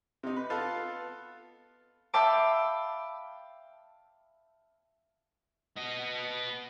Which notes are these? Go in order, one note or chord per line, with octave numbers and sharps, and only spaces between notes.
C3 D#4
B4
B3 F4 A4
E5 F5 G5 A5 B5 D6
B3 D#5